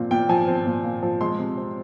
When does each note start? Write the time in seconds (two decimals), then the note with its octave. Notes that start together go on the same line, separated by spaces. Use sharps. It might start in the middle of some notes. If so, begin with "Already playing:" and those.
Already playing: A#2 F3 C4
0.11 A#2 G5
0.29 F3 G#5
0.48 C4
0.66 A#2
0.84 A#2
1.03 F3
1.21 G#3 C6
1.39 C3
1.57 C4